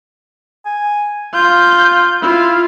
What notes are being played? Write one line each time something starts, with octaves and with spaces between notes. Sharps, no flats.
G#5
F4 G6
E4 F4